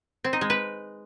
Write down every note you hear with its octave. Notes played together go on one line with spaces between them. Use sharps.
C4
D#4
G#3
B4